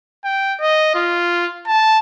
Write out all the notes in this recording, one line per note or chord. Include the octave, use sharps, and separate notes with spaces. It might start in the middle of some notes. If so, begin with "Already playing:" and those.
G5
D#5
F4
A5